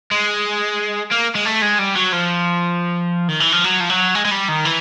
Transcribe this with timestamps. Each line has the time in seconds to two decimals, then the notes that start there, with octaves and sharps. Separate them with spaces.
0.11 G#3
1.12 A#3
1.35 G#3
1.45 A3
1.62 G#3
1.79 G3
1.96 F#3
2.13 F3
3.29 D#3
3.40 E3
3.52 F3
3.64 F#3
3.80 F3
3.90 F#3
4.15 G#3
4.25 G#3
4.31 G3
4.48 D#3
4.65 E3